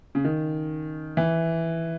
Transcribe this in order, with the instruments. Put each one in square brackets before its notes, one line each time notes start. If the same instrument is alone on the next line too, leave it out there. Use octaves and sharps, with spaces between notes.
[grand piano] C#3
D#3
E3